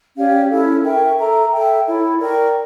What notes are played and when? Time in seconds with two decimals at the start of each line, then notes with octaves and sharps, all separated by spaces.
0.15 C#4 G4 D5 F5
0.49 C#4 E4 A4
0.83 A#4 E5 G5 C#6
1.17 A4 E5 A#5
1.51 A4 E5 G5
1.86 E4 A4 C#5
2.19 A#4 D5 G5 C#6